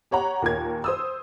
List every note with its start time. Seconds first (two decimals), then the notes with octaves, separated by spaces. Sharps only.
0.11 G4 C#5 F#5 A#5
0.42 D#2 A#2 A#4 G#6
0.84 C5 D#6 E6